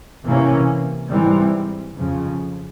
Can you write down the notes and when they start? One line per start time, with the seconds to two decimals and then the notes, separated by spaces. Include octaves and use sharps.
0.26 C3 E3 A#3 C#4
1.11 G#2 E3 G3 C4
1.96 F2 C#3 F3